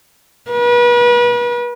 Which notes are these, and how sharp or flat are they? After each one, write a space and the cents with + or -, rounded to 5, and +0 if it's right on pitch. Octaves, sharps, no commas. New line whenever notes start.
B4 -35